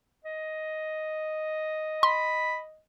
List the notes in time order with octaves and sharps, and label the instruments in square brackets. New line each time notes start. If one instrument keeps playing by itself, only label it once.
[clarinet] D#5
[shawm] B5 [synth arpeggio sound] C6